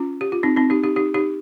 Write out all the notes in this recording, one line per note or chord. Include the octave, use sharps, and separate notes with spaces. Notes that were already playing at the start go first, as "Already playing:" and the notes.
Already playing: C#4 F4
G4
F4
C4 D#4
C4 D#4
D#4 G4
D#4 G4
D#4 G4
D#4 G4